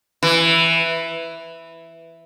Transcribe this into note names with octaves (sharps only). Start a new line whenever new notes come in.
E3